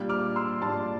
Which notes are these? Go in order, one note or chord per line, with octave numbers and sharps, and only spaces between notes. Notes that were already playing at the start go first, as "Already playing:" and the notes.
Already playing: A#2 G3 D4
D6 F6
C6 E6
A#2 G3 D4 A5 C6